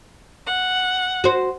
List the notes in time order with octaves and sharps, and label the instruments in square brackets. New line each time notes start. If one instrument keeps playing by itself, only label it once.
[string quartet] F#5
[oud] F#4 C5